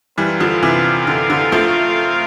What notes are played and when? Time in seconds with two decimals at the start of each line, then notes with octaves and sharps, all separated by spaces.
0.18 E3 G3 C4 F4 A#4 F5
0.40 D3 F3
0.63 C3 E3
1.07 D3
1.30 D3
1.52 F3 A3